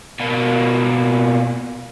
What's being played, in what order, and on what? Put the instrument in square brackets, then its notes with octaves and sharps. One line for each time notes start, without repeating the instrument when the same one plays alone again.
[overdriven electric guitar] B2 A#3